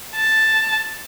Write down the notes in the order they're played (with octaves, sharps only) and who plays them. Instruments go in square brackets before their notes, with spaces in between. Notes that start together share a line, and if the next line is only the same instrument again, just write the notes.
[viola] A5